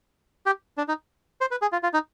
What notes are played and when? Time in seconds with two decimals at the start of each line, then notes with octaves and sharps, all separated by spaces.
0.46 G4
0.78 D4
0.88 D#4
1.41 C5
1.51 B4
1.62 G#4
1.72 F4
1.83 F4
1.94 D#4